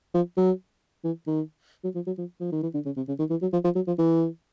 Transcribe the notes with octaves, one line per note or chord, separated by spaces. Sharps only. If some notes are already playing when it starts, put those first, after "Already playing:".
F3
F#3
E3
D#3
F#3
F3
F#3
F3
F3
D#3
E3
D3
C#3
C3
C#3
D#3
E3
F#3
F3
F3
F#3
F3
E3